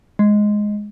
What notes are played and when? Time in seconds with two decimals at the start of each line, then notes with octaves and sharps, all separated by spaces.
0.19 G#3